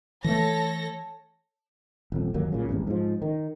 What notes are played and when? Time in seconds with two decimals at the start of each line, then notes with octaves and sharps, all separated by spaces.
0.24 E3 A3 A4 C#5 A#6
2.12 D#1 F2
2.34 G1 D#2 F#3 A#3
2.52 B1 A#2 C#3
2.69 G#1 E2 G2
2.87 G#2 F3
3.22 D#3